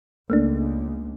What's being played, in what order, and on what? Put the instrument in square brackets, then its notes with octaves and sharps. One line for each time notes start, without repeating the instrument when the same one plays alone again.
[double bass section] C#2 [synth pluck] A3 A#3 D4